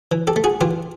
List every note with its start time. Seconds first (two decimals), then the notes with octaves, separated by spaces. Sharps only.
0.12 E3
0.27 G4 A4
0.36 A3
0.44 F#4 G#4
0.61 E3 F4 G4